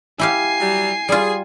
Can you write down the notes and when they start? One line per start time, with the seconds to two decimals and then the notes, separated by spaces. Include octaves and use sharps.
0.19 E4 G4 F5 G#5 C7
0.60 F#3 G3
1.09 G3 F4 G#4